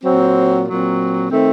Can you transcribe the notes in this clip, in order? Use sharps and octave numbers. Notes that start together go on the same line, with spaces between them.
A#2 F#3 C4
A#2 F#3 C4
D#3 A3 C4